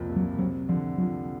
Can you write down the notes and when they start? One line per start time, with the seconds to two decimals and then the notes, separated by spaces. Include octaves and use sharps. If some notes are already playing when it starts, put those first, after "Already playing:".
Already playing: C2 F2 A#2 A#3
0.10 C3
0.16 F#3
0.39 F#3 C4
0.69 D3 F3
0.98 F3 F#3